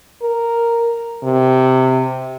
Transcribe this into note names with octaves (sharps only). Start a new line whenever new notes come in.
A#4
C3